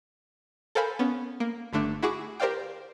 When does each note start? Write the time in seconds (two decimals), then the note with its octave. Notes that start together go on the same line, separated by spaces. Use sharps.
0.75 A4 A#4 C5 F5 G#5 B5
0.99 B3 C#4
1.40 A#3
1.73 G1 D3 A3 D4
2.03 E4 F#4 G#4 C#6 D6
2.40 G4 A#4 C5 D5 F5 G5